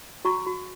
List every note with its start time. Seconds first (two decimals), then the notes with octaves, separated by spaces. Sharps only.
0.25 F#4 A#5 C#6
0.46 F#4